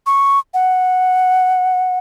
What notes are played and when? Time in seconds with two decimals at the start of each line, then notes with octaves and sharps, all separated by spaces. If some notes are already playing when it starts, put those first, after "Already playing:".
0.06 C#6
0.54 F#5